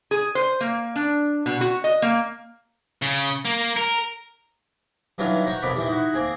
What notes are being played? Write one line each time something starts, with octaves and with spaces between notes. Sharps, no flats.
G#4
C5
A#3
D4
B2
F#4
D#5
A#3
C#3
A#3
A#4
G2 D#3 E3 F#3 F4 F5
F#4 C5 G5 A#5 C#6
B1 F2 B2 A#4 D5 B5
D#3 E3 G3
D#4 E4 F#4
A#3 C4 G#4